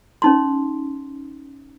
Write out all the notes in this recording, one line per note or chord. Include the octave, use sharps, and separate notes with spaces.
C#4 D#4 C6